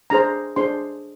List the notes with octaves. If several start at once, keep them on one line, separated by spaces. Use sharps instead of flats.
D4 G#4 C5 A#5
D4 G#4 C5 C6